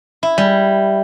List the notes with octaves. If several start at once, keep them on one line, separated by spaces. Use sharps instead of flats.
E4
G3